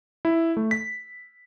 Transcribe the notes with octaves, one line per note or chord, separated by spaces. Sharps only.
E4
A3
B6